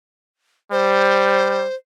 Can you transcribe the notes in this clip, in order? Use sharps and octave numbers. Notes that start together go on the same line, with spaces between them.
G3 C5